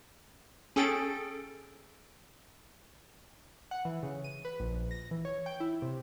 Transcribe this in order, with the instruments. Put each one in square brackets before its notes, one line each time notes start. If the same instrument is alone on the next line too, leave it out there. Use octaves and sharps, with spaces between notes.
[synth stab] C#4 G#4 A4 G5 A6 D7
[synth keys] F#5
E3
C#3
D#7
B4
A#1
A#6
E3
C#5
G5
E4
C3